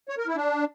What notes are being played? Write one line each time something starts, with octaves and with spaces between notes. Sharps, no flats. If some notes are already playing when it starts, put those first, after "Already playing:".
C#5
A#4
E4
D4